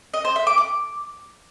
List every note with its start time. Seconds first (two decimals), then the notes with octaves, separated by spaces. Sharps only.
0.14 D#5
0.25 C5
0.36 E5
0.47 D6
0.58 D6